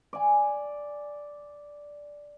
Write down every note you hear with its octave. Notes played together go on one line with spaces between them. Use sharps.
D5 G#5 D6